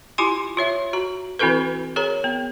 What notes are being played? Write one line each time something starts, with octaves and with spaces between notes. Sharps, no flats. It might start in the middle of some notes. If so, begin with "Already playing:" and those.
E4 F4 G4 G#5 C6 D6
F4 C#5 E5
F#4 A#5
E3 C4 E4 F#4 A4 B4
G#4 A#4 C#5 A#5
B3